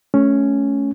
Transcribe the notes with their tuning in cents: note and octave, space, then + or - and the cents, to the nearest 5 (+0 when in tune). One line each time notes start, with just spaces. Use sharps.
A3 -20 C#4 +0